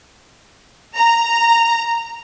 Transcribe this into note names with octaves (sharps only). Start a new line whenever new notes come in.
A#5